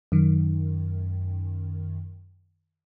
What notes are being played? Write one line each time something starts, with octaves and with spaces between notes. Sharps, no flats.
F#2 D#3